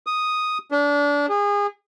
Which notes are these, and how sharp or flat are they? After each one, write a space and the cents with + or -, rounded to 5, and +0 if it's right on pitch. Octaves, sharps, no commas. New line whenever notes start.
D#6 +0
D4 -25
G#4 -30